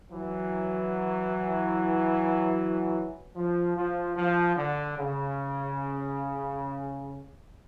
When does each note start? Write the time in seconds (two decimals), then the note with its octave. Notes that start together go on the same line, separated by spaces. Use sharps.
0.11 E3 F#3
3.35 F3
3.76 F3
4.16 F3
4.57 D3
4.97 C#3